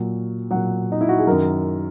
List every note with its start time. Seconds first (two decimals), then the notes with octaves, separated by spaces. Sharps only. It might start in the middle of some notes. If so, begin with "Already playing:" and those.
Already playing: A#2 F#3
0.50 A#2 F#3 F#5
0.92 D#4
1.01 E4
1.09 F#4
1.19 G#4
1.27 F#2 D#3 F#3 A#4